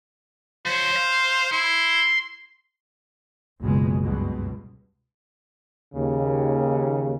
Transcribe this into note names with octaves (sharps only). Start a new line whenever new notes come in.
F3 C5 C#5
F5
E4 C6
F#1 C#2 B2 G#3
C#2 G2 B2
D#2 C#3